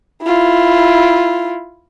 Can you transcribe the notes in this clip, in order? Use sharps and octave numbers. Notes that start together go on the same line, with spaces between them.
E4 F4